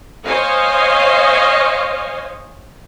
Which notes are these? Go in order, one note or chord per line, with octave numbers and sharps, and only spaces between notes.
C5 C#5 D#5 F5 G#5